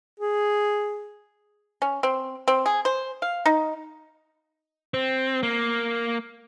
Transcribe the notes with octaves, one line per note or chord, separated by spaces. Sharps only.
G#4
C#4
C4
C4
G#4
C5
F5
D#4
C4
A#3